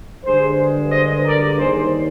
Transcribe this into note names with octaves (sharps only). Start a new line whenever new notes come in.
G2 D3 G#3 G#4 C5
C5 D#5
A#4 D5
D#2 D#3 G3 G#4 C5